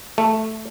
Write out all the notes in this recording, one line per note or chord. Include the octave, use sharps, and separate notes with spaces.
A3